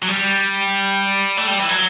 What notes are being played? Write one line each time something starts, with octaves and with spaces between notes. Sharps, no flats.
F#3
G3
A3
G3
E3
F#3